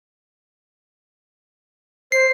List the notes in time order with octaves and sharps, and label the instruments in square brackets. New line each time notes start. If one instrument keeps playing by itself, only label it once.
[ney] C5 [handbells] C7